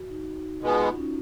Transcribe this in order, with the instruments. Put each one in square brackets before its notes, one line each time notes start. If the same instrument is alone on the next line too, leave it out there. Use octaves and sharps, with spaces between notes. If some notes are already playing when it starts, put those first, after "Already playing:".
Already playing: [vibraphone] F#4
D#4
D#4
[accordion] B2 G#3 B3 [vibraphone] F4
[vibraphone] C#4
D#4